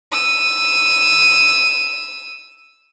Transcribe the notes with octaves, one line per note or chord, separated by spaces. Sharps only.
E6 D#7